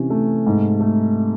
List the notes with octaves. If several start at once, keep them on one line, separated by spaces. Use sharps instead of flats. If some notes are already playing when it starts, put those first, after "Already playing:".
Already playing: C3 E3 C#4
A3
G#2
A3